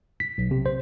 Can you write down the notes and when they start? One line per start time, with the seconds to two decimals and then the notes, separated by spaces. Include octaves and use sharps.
0.20 B6
0.38 B1
0.51 C3
0.66 C5